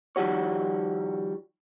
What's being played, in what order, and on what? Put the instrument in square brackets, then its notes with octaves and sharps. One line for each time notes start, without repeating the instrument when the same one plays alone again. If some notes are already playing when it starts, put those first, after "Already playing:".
[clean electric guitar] D#3 F3 G3 F#4 C#5